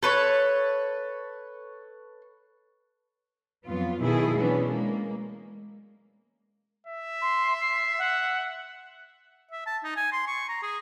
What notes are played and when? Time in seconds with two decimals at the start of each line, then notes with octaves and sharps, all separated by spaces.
0.03 A4 B4 C#5
3.66 F2 F#3 B3 F4
4.01 B2 D#3 F#3 E4 G#4 A4
4.37 E3 F#3 B3 C#4 D4
4.70 G#3 A#3
6.87 E5
7.22 C6
7.60 C7
7.99 F#5
9.51 E5
9.67 A5
9.84 D#4
9.97 G#5
10.12 C6
10.27 C#6
10.49 A#5
10.63 G#4